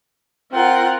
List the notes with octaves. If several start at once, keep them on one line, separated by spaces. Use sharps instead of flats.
C4 F4 A#4 F#5